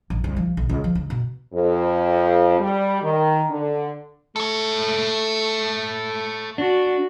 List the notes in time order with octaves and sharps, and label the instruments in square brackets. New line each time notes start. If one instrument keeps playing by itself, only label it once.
[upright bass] A1
C2
F3
B1
C#2
F3
C#2
B2
[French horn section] F2
G3
D#3
D3
[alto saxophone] A3 [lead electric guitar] A4 C#5
[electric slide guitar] D4 [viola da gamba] F#4